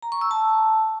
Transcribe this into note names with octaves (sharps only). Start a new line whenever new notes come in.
A#5
C#6
E6
A5